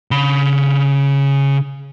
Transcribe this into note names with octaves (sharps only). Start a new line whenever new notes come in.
C#3 B5